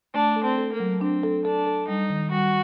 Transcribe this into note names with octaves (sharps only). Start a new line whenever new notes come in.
A3 D4
A4
C4
A4
A#3
F#3
C4 D4
A4
D4 A4
A4
G3 D#4
D#3
G3 F#4